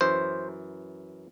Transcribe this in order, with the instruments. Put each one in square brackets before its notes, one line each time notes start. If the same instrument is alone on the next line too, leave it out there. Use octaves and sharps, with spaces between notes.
[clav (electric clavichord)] F#2 E3 C5